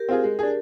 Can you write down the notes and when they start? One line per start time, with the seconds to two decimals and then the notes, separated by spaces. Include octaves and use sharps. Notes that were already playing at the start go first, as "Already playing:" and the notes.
Already playing: G4 A#4
0.09 C4 F4 G#4
0.24 G#3
0.39 D4 G#4